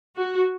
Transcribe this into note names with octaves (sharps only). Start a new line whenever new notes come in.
F#4